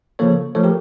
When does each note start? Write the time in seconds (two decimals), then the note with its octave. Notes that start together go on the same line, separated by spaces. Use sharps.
0.19 C#3 F3 A#3 A4 C#5
0.55 F3 A3 A4 C#5
0.64 G4 A#4